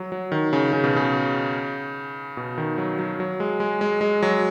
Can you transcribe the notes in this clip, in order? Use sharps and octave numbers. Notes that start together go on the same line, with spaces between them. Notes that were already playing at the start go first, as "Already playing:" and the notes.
Already playing: F#3
F#3
D#3
C#3
C#3
B2
C#3
B2
D#3
F#3
F#3
F#3
G#3
G#3
G#3
G#3
F#3